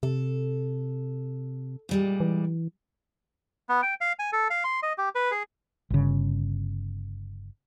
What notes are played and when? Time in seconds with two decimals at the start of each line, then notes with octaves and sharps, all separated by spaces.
0.03 C3 A4
1.89 A#2 G3 G#3
2.20 E3
3.69 B3
3.82 G5
4.01 F5
4.19 G#5
4.33 A4
4.50 F5
4.64 C6
4.83 D#5
4.98 G4
5.15 B4
5.31 G#4
5.90 G1 C#3